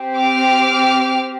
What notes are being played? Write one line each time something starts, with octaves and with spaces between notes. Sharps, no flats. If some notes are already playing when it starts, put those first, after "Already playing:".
Already playing: C4 G4
D6 F6